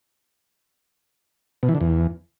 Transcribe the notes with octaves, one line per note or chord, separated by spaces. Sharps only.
B2
E3
D3
E2